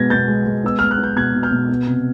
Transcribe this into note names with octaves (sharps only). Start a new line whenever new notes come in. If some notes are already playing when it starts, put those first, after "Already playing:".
Already playing: B2 G#3 B3 G#6 A#6
B2 G6 A6
G#3
G#3
B3 E6
G#3 F6
F#6
B3
G6
B2 F#6 G#6
B2
F6 G6
B2
B3
C3